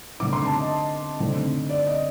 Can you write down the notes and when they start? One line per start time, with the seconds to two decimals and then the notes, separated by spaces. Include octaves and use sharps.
0.20 D3 A3 C4 D#4 D6
0.33 C6
0.45 A5
0.58 D#5
1.20 D3 A3 C4 D#4
1.70 D5
1.87 D#5